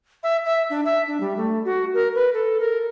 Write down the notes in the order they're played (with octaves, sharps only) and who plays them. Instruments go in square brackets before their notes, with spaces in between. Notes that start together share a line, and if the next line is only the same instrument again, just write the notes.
[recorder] E5
E5
D4
E5
D4
G3
A3
F#4
A#4
B4
A4
A#4